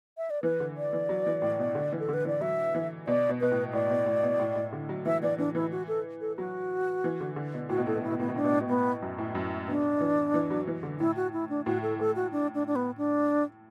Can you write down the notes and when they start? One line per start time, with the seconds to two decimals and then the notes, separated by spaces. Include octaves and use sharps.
0.18 E5
0.30 D5
0.43 E3 B4
0.60 D3
0.77 D5
0.93 E3
1.09 F#3
1.26 E3
1.42 A2
1.59 B2
1.75 D3
1.92 E3
2.00 A4
2.08 D3
2.14 B4
2.25 E3 D5
2.41 F#3 E5
2.75 E3
3.07 B2 D5
3.29 B2
3.41 B2 B4
3.51 A2
3.73 A2 D5
3.90 B2
4.06 A2
4.23 B2
4.39 A2
4.56 A2
4.73 D3
4.89 F#3
5.05 E3 E5
5.23 E3 D5
5.38 E3 D4
5.55 E3 E4
5.71 F#4
5.88 A4
6.21 A4
6.38 F#3 F#4
7.04 E3
7.20 D3
7.36 D3
7.54 B2
7.69 A2 F#4
7.77 B2
7.87 A2 A4
7.95 B2
8.03 A2 E4
8.11 B2
8.19 A2 B3
8.28 B2
8.36 A2 D4
8.44 B2
8.52 A2
8.61 B2
8.69 A2 B3
9.02 F#2
9.18 A2
9.35 F#2
9.68 B2 D4
10.00 E3
10.34 E3
10.50 F#3
10.67 E3
10.83 D3
11.00 A2 E4
11.16 F#4
11.33 E4
11.49 D4
11.66 A2 F#4
11.82 A4
11.99 A2 A4
12.16 F#4
12.32 D4
12.54 D4
12.67 D4
12.76 B3
12.97 D4